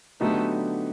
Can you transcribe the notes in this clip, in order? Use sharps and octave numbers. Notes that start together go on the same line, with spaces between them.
D3 F#3 A3 B3 D#4 G4